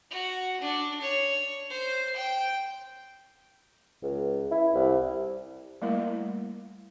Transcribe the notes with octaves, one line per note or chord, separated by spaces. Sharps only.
F#4
D4
C#5
C5
G5
C#2
E4
C2
G3 A3 A#3 E4 A#4